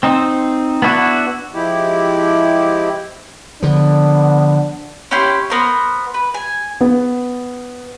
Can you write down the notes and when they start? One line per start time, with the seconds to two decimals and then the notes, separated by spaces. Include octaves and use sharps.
0.03 C4 D#4
0.82 B3 D4 E4 F#4
1.54 F3 G#3 E4 G4
3.62 D3 F3 B3 D4
5.11 C#4 E4 G4 C6
5.50 B3 A#4 C5 C6
6.14 B4
6.34 G#5
6.81 B3